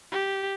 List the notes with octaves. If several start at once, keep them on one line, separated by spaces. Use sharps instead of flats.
G4